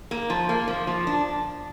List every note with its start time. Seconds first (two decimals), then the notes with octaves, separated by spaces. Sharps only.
0.11 A#3
0.30 F3
0.49 A#3
0.68 F3
0.87 F3
1.07 D4